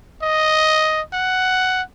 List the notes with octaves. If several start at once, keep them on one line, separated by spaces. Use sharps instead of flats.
D#5
F#5